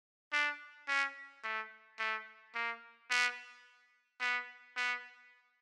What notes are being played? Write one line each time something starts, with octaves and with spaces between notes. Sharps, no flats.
D4
C#4
A3
A3
A#3
B3
B3
B3